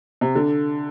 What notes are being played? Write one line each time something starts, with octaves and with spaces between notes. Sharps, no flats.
C3
D3